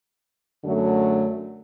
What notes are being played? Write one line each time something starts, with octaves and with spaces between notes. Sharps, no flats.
F#2 D3 F#3 A3